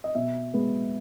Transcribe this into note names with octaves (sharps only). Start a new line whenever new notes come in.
D#5
B2 E5
G#3 B3